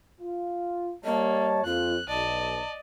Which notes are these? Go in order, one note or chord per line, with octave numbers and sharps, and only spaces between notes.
F4
G3 A#3 C#5 D#5 A5
F2 F4 F#6
B1 D5 D#5 A5